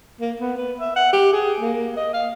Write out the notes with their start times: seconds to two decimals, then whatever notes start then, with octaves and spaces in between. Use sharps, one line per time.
0.21 A#3
0.40 B3
0.57 B4
0.80 E5
0.96 F#5
1.13 G4
1.32 G#4
1.60 A#3
1.97 D#5
2.13 F5